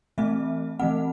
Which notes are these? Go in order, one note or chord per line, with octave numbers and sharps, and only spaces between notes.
E3 A3 C4 E5
E3 A3 C4 F#5